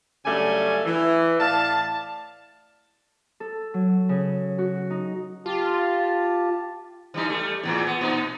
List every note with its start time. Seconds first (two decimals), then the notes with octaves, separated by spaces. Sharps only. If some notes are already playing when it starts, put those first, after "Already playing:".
0.24 F#2 C#3 G3 A3 D4 G#5
0.85 E3
1.39 A2 D5 F5 A5
3.40 A4
3.74 F#3
4.09 C#3
4.58 F#4
4.90 D#4
5.46 F4 G4 A5
7.14 E3 G3 D#4
7.30 G3 A3
7.63 E2 A2 E3
7.86 B3
8.01 A#2 D#4